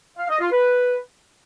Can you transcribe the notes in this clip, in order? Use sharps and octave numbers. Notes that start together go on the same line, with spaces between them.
F5
D#5
F4
B4